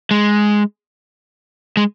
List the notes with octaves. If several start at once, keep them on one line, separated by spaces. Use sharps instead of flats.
G#3
G#3